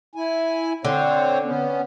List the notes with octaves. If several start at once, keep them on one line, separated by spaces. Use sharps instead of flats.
E4 G#5
D3 C4 C5 C#5
B3 C#4